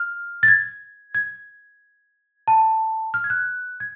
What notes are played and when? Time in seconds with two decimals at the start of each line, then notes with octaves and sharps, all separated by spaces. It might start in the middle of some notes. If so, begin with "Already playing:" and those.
Already playing: F6
0.43 A6
0.48 G#6
1.15 G#6
2.48 A5
3.14 F6
3.24 G#6
3.30 F#6
3.80 G#6